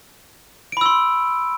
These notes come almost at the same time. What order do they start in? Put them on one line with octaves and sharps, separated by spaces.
D7 B5 E6 C6